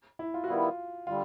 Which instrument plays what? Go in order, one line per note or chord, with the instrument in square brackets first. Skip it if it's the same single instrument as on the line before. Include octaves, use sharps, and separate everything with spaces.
[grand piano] E4
F4
F#4
[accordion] D#3 G3 B3 E4 [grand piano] F4
[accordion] D3 G3 [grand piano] F4